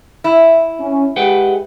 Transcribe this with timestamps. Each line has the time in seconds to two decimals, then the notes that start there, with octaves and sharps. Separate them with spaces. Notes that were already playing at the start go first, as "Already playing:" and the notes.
0.24 E4
0.80 C#4
1.16 G#3 G4 B4 F#5 G5